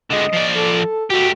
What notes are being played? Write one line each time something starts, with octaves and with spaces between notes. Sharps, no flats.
D3 G#3 D#5
F3 D5
A4
A3 F#4 G4